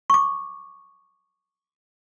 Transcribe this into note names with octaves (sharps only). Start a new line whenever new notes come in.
C#6 D6